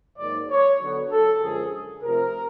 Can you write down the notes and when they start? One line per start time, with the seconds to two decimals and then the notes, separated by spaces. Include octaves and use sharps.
0.18 G#2 D#3 F#3 A#3 D5
0.50 C#5
0.80 D3 F#3 B3
1.11 A4
1.41 F#2 D3 F3 G#3 G#4
2.03 C3 F3 A3 C4 A#4